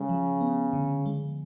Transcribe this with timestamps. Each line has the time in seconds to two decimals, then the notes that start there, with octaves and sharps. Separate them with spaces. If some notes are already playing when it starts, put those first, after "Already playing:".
Already playing: C#3 G#3
0.09 F3
0.41 B3
0.73 D3
1.06 G#3